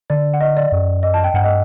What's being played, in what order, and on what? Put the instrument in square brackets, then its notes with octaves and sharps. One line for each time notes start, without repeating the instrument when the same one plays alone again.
[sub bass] D3 [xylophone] D5
[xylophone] F#5
D#5
D5
[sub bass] F#2
[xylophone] D#5
A5
G5
[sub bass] G2 [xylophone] F#5
[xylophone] D#5